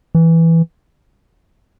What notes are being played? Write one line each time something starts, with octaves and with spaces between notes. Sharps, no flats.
E3